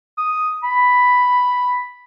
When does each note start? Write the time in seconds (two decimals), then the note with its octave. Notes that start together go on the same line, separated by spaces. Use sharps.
0.18 D#6
0.63 B5